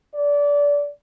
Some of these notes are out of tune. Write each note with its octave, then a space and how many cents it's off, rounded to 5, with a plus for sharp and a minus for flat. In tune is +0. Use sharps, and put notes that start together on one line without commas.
D5 -25